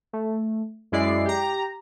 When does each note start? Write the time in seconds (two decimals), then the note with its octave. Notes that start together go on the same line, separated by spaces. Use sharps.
0.13 A3
0.92 F#2 G#3 E4 D5 C7
1.25 G4 A#5